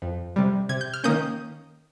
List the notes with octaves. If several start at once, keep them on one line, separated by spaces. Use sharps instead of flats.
F2
C3 G3
C3 G#6
G6
F6
D#3 A#3 C#4 D#6 G6